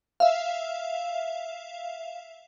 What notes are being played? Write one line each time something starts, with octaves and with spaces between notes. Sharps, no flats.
E5 F5